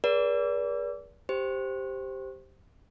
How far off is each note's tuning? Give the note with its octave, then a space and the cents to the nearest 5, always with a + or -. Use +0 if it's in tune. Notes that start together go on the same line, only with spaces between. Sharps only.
G#4 +0 B4 -40 D5 -30
G4 +0 C5 +0